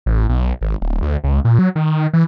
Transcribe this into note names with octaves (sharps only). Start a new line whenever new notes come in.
A1
B1
G#1
D1
D2
C#2
A#2
F#3
D#3
E3